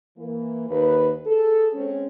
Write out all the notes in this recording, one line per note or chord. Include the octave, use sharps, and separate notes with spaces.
E3 A#3
D#2 B4
G#4 A4
G#3 C4 C#4